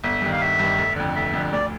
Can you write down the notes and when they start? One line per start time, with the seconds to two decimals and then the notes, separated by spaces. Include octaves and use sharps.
0.04 G1 E5
0.22 G2 D#3
0.32 F5
0.41 G1 E5
0.60 G2 D#3
0.78 F1
0.96 F2 D3
1.15 F1 E5
1.33 F2 D3
1.53 D2 D5